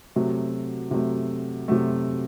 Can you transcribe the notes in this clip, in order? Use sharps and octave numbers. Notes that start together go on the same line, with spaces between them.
C3 F#3 A3
C3 F#3 A3
C3 F#3 A3